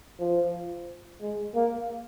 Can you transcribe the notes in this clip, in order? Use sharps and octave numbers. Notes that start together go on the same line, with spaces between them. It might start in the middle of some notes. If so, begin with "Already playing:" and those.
F3
G#3
A#3